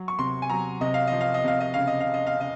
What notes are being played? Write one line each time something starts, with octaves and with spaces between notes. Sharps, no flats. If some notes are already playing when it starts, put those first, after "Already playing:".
Already playing: F#3
C#6
C3 C6
G#5
F#3 A#5
C3 D#5
F5
F3 D#5
F5
D#5
C3 F5
D#5
C#3 F5
D#5
F5
C#3
D#5
F5
C#3 D#5